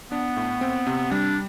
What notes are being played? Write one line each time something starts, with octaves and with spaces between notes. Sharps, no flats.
B3 D4
A2
C4
C3
G3 D4